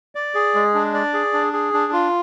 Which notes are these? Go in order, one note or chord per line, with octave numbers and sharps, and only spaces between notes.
D5
G#4
G#3
D4
D5
G#4
D4
G#4
D4
F4